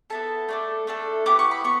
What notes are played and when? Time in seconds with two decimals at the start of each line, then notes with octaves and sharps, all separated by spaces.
0.10 B3 E4 A4 A5
0.49 A3 D4 A4
0.87 A3 D4 A4
1.26 B3 E4 G4 D6
1.39 C#6
1.51 B5
1.64 B3 C#6